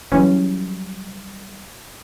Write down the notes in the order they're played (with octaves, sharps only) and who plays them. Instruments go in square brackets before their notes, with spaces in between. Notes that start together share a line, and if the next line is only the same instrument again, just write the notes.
[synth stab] C#3 E3 C#4 [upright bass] F#3 G3